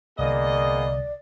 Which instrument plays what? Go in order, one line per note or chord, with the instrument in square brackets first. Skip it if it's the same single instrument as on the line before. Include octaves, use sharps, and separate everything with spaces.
[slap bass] C2 D3 [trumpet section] A#3 B3 G#4 [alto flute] D5 [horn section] D#5